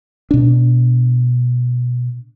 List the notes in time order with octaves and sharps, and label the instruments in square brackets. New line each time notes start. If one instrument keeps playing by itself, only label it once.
[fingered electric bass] B2 D4